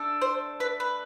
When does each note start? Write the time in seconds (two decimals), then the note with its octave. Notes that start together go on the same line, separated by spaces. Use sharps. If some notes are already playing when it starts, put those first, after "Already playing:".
Already playing: A3 D4 A4
0.22 C5
0.60 B4
0.80 B4